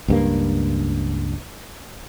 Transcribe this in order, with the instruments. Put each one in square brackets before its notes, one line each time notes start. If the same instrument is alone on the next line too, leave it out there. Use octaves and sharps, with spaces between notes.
[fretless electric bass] C#2 G2 A#3